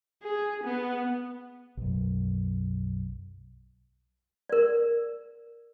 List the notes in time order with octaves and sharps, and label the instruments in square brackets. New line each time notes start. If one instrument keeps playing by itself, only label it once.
[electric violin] G#4
B3
[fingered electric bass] B1 F#2
[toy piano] A#4 D5